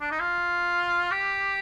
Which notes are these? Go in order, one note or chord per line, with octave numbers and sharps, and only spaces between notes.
D4
D#4
F4
G4